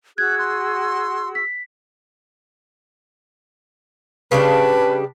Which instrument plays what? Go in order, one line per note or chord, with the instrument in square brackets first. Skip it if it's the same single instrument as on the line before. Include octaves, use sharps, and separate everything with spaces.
[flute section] F#4 G#4 E6 [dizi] F#6 [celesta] G#6
[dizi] C6 [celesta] F#6
[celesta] B6
[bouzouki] C#3 G3 D4 [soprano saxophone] B4